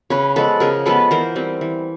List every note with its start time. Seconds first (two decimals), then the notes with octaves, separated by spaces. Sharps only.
0.10 C#3 B4 C#5
0.36 F3 G#3 B3 A4 B4
0.60 C#3 G#4 A#4
0.86 F3 G#3 B3 A4 B4
1.11 E3 A#4 C5
1.36 G3 C4
1.61 E3